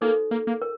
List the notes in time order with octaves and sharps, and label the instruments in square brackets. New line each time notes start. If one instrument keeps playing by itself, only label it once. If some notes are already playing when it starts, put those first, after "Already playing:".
[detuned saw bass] A#3 [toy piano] D#4 F#4 A4 C5
[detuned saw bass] A#3
A#3
[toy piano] A#4